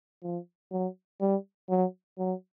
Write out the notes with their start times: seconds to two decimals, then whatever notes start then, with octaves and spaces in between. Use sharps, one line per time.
0.23 F3
0.72 F#3
1.21 G3
1.70 F#3
2.18 F#3